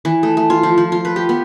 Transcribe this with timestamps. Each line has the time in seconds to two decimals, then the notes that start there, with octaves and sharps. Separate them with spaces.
0.05 E3
0.23 A3
0.37 A3
0.50 F4
0.63 F3
0.78 F3
0.92 F4
1.05 B4
1.16 G4
1.29 B3